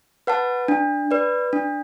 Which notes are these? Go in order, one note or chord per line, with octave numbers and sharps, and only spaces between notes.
B4 F#5 A5
D4
B4 D5
D4